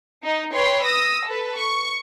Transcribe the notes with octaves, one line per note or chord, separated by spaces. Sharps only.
D#4
B4 C#5 G5 C6
D#6 E6 A#6
A4 B4
C#6